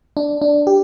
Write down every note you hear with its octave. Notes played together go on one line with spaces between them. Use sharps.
D4
D4
G4